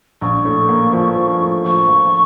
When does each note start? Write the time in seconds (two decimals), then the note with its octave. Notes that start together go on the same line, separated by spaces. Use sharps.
0.21 A#1 C#6
0.45 A2
0.69 A#3
0.93 F3
1.16 F3
1.40 A2
1.64 F3 C#6
1.89 F3